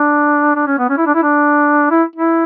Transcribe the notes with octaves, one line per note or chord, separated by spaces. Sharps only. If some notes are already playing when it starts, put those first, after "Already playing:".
Already playing: D4
D4
C#4
B3
C#4
E4
D4
E4
D4
E4
E4